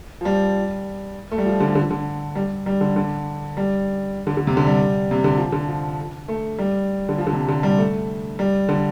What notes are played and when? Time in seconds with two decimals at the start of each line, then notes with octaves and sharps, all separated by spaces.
0.21 F3
0.25 G3
1.31 A3
1.38 G3
1.46 F3
1.60 D3
1.70 F3
1.75 D3
1.91 D3
2.35 G3
2.66 G3
2.81 D3
2.96 D3
3.57 G3
4.27 D3
4.37 D3
4.47 C3
4.57 D3
4.67 G3
5.11 C3
5.24 D3
5.38 F3
5.52 D3
5.68 F3
6.28 A3
6.59 G3
7.09 D3
7.18 F3
7.27 D3
7.33 C3
7.49 D3
7.63 G3
7.78 A3
8.39 G3
8.69 D3